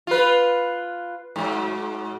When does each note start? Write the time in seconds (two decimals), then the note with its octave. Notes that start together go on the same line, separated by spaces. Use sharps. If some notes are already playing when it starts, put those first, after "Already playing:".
0.07 F4 B4
1.36 G#2 F#3